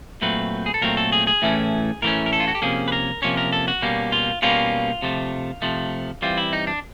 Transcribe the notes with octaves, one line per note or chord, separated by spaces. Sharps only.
A#2 F#3 A3 C4 B4
G#4
A4
A#2 F#3 A3 C4 A#4
A4
G#4
G#4
A2 E3 A3 C#4
A2 E3 A3 C#4 A#4
A#4
A4
F4
F#4
G4
C3 F3 A#3 C#4 G#4
B4
A#4
C3 F3 A#3 C#4 C#5
A#4
A4
F#4
B2 G3 A#3 C#4
F4
B2 G3 A#3 C#4 F4
C3 F3 A3
C3 F3 A3
E3 G3 C4 F4
E4
D#4
D4